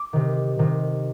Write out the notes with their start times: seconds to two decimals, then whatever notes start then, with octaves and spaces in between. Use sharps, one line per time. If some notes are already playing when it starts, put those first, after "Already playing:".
Already playing: D6
0.13 C3 D#3
0.59 C3 D#3